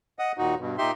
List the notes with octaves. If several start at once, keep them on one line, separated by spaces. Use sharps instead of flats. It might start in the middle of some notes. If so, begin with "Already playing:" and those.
D#5 F#5 D#6
D#2 A#2 D#4 F#4
G2 B2
A#2 D#4 G4 E5 C6